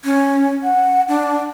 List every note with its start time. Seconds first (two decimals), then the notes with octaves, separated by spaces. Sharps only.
0.04 C#4
0.63 F#5
1.08 D4